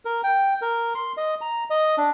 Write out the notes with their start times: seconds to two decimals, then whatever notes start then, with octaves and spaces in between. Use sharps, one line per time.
0.05 A#4
0.24 G5
0.62 A#4
0.95 C6
1.17 D#5
1.41 A#5
1.70 D#5
1.98 D4